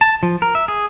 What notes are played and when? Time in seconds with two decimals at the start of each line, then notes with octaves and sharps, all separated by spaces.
0.01 A5
0.23 F3
0.42 A#4
0.55 E5
0.68 G#4